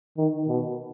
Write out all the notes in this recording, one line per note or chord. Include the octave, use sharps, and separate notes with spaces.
D#3
B2